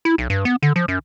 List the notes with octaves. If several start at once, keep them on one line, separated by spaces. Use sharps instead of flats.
E4
B1
G2
B3
D3
F3
F#2